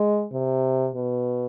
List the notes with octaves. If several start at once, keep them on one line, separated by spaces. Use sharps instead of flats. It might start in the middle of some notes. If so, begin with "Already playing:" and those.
Already playing: G#3
C3
B2